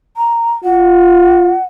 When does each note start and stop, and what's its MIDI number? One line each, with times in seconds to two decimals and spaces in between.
0.17 0.52 82
0.64 1.55 65
0.64 1.63 78